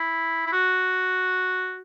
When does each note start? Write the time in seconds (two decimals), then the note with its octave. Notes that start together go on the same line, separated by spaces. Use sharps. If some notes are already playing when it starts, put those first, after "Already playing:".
Already playing: E4
0.46 E4
0.52 F#4